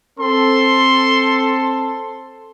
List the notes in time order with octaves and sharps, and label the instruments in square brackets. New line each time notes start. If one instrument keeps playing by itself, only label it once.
[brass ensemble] C4 A4 [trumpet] C6